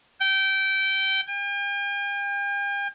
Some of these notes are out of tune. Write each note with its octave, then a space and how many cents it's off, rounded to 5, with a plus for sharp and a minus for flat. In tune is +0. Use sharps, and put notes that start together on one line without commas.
G5 -20
G5 +45